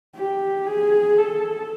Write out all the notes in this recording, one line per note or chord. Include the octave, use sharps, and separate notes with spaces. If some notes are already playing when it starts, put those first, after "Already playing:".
G4
G#4
A4